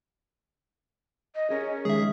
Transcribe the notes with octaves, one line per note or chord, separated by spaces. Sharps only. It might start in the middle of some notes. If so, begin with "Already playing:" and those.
D#5
C#4 G#4 A#4
E2 D#3 G#3 G#4 E5